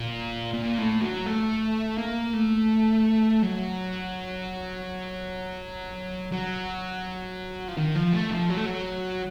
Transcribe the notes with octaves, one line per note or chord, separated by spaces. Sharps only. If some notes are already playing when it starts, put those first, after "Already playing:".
Already playing: A#2
A#2
A2
F#3
A3
A#3
A3
F#3
F#3
F3
D#3
F3
A3
F3
F#3
A3
F#3